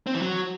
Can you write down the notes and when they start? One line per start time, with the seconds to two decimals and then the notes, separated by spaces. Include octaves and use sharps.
0.07 C4
0.14 E3
0.22 F#3